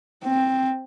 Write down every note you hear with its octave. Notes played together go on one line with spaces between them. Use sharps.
C4